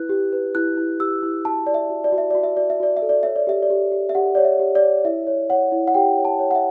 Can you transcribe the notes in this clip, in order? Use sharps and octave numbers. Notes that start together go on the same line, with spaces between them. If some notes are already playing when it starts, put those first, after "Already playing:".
Already playing: E4 B4 F#6
G4
B4
E4 F#6
E4
G4 E6
E4
F#4 A5
D5
E5
F#4
D5
F#4
E5
F#4 D5
E5
F#4 D5
E5
F#4 D5
E5
A4
D5
C#5 E5
D5
G4 E5
D5
G4
G4
E5
G4 F#5
C#5 D5
E5
G4
D5
C#5
E4 E5
C#5
C#5 F#5
E4
F#5
G4 G5
C#5
A5
C#5
F#5
E5